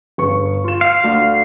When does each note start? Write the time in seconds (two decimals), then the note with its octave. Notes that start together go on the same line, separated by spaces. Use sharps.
0.18 G1 C#6
0.64 F4 E7
0.81 F5
1.04 D2